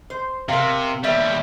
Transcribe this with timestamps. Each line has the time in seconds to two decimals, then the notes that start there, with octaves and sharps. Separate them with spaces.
0.10 C5
0.49 C3 A#4 F5
1.04 D#2 G3 B3 C#5 E5